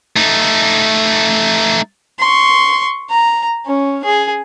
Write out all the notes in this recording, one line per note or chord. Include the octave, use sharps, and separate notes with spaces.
A3 D#4
C6 C#6
A#5
C#4
G#4